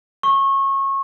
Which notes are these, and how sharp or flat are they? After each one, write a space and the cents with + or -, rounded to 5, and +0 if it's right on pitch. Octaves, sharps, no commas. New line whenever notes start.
C#6 -25